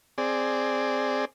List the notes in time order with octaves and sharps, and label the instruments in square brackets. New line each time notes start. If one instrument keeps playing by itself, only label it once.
[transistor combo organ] C4 G#4 D5